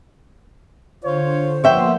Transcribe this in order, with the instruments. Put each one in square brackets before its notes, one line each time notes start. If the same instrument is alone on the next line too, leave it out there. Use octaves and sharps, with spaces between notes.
[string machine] D3 [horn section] F4 C#5 [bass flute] C5
[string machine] F3 A#3 [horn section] B3 C6 [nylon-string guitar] C#5 E5 G5